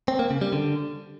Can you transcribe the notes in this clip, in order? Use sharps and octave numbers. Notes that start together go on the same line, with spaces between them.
C4
A#3
C#3
G3
D3